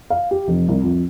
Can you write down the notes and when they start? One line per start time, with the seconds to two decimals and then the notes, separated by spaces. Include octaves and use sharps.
0.10 F5
0.31 G4
0.48 F1
0.68 C2
0.83 F2